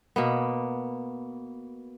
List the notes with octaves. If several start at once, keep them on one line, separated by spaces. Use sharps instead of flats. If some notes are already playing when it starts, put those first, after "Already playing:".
B2 A#3 B3